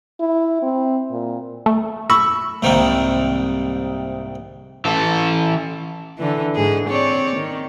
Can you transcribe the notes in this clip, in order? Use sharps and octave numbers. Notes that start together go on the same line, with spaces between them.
E4
C4
A#2
A3
B5 C#6 E6
C2 G#2 C3 D#3 A#3
E3 A4
D3 E3
G#2 D3 G#4
C4 C#5 D5
D#3